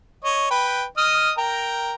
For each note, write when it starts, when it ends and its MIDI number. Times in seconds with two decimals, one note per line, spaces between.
0.25 0.48 73
0.25 0.48 75
0.51 0.84 71
0.51 0.84 79
0.98 1.32 75
0.98 1.32 87
0.98 1.32 89
1.38 1.95 70
1.38 1.95 79
1.38 1.95 82